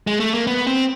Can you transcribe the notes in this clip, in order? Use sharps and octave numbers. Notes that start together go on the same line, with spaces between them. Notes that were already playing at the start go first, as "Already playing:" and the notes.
G#3
A3
A#3
B3
C4